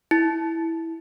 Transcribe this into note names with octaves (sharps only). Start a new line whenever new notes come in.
E4